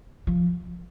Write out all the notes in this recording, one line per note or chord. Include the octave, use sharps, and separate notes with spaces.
F3